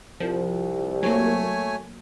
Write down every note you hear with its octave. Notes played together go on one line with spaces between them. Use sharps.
C2 F3
F#3 A3 A#3 C#5 G#5